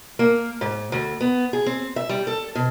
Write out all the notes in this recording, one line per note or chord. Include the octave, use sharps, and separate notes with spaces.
A#3
G#2
D2
B3
G#4
C4
E5
G3
A4
B2